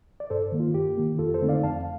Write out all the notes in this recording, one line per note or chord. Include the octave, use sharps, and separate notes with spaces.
D5
G2 A4 C5
D#3 A#3
F4
G2 G4
D#3 A#3
F2 F4 A4
A4 C5
D3 A3 C4 D#4
D5 F5
F2 F5 A5